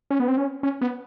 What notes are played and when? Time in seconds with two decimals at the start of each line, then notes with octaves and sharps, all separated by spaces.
0.11 C#4
0.20 B3
0.28 C4
0.37 C#4
0.63 C#4
0.81 B3